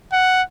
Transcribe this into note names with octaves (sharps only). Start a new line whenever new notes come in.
F#5